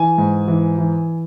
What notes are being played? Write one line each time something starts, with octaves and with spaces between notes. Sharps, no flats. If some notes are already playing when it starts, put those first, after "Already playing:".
Already playing: E3 G#5
G#2
E3
E3